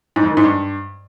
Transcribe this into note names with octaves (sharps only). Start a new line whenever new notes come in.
G#2
F2
D#3
G#2
G2